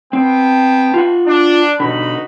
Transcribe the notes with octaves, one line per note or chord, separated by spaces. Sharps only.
B3 C4 G5 A5
F4 F#5
D4
B2 D3 D#4 F#4 B5